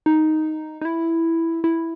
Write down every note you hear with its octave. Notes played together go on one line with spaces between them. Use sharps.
D#4
D#4
E4
E4